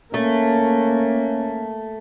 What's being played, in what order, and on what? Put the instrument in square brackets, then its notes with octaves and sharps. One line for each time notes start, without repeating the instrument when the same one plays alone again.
[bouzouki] A3 [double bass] A#3 [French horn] C#4